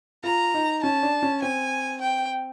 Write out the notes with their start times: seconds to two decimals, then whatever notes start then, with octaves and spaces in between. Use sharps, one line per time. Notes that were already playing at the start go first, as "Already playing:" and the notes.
0.24 F4 A#5
0.54 D#4
0.83 C#4 A5
1.03 D4
1.22 C#4
1.42 C4 G#5
2.01 G5